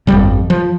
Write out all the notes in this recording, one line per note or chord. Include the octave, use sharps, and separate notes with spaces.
G1 F2 C#3 G3
F3